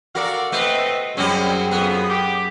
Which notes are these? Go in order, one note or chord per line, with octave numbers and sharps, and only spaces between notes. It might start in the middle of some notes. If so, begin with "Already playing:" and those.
F#4 A4 A#4 D5 F5
A3 C4 B4 D#5
F#2 F#3 G3 C4 C#4 G#4
F2 B3
G4